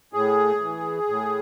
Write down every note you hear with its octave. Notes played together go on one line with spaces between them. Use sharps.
A2 G#4
E3
A2